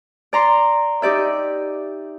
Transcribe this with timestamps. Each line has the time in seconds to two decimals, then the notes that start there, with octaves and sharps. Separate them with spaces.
0.33 D5 A#5 C6
1.02 D#4 G4 D5 E5